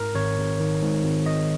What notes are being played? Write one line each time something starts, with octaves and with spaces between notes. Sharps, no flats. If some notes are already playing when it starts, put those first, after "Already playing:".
Already playing: G#2 A#4
G#1 C#5
G#1
D#3
G#2
G#1
G#1 D#5